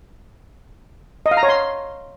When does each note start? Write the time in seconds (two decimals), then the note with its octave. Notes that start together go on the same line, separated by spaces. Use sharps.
1.26 D#5
1.31 F5
1.37 A#5
1.43 C#5
1.49 C6